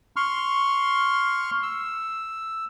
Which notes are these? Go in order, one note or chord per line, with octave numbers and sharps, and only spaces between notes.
C6 C#6 F6
E6